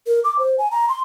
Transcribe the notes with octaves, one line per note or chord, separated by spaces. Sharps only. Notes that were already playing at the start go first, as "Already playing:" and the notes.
A#4
D6
C5
G#5
A#5
C6